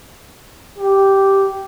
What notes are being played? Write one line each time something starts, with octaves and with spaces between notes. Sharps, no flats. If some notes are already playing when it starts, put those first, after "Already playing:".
G4